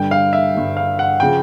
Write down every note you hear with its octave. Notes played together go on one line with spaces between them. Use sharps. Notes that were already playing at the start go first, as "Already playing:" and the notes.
Already playing: G2 D3 G3 G5
F5
E5
G2 D3 G3
F5
F#5
C#3 F3 G5